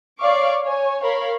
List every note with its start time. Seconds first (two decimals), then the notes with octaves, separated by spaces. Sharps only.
0.21 C#5 D5 F5 C#6 D6
0.65 C#5 G#5
1.03 A#4 C#5 F5 B5